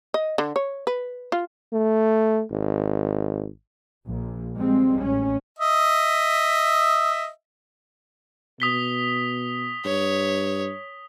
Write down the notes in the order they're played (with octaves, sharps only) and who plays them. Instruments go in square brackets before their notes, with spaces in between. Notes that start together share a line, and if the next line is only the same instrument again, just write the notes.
[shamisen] D#5
D3
C#5
B4
F4
[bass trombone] A3
G#1
[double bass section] A#1
F3 G3 G#3 C4
A1 C#4
[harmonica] D#5 E5
[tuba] B2 [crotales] D#6 B6 G7
[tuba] G2 [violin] C#5